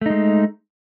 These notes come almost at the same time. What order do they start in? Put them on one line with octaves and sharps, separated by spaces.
A3 D#4 G#3